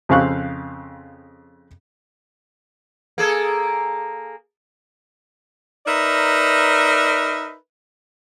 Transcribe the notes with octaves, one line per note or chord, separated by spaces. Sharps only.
F2 C#3 C4 F5 C#6 F#6
A#3 G#4 A4
D#4 A#4 B4 D5 E5